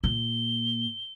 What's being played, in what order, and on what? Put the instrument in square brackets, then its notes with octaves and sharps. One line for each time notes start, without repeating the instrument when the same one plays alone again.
[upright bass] A#2 [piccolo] G7